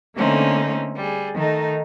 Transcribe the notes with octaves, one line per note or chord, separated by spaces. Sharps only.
D3 A3 A#3 C4 C#4 D#4
G3 G#4
D#3 A3 D#4